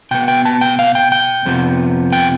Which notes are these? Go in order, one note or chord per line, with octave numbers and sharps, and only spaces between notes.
B2 B3 G5
G5
A5
G5
F5
G5
G5
F2 C3 F3 B3
G5